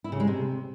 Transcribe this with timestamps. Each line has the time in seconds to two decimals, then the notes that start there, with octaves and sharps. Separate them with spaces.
0.04 E4
0.12 C#3
0.20 G#3
0.27 C3